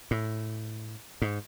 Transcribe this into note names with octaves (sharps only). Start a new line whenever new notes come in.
A2
G#2